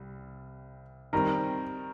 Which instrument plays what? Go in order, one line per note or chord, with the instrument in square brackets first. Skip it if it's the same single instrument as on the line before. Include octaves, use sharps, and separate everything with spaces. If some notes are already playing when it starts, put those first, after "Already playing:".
Already playing: [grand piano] C2 G3
[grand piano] D#3 G3 C4 [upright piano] A#4